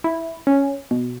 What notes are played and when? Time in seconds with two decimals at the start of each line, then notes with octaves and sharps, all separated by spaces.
0.04 E4
0.47 C#4
0.91 B2